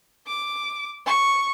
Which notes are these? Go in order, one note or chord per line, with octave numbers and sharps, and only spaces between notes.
D6
C#6